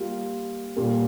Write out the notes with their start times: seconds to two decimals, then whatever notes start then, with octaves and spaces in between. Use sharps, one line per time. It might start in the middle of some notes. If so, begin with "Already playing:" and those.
Already playing: G3 A#3 F4
0.76 A#2 G3 A#3